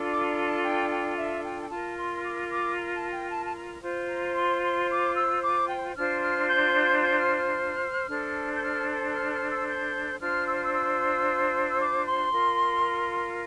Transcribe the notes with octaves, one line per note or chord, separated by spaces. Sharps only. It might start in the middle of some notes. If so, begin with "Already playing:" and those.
Already playing: D4 F4 A4
D6
A#5
A5
G5
G5
E5
G5
G5
F4 A#4 A5
C6
D6
D6
A#5
A5
G5
A5
A5
A#5
F4 C5
A#5
C6
C6
D6
E6
D6
G5
D4 F4 C5 F6
F6
G6
G6
F6
F6
D4 A4 C5
G6
F6
F6
F6
E6
G6
D4 F4 C5 F6
E6
F6
E6
E6
E6
D6
C6
F4 A#4